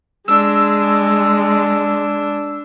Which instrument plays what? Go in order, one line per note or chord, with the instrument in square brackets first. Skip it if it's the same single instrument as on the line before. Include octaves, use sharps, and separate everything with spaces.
[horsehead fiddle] G#3 [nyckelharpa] D4 [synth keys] E6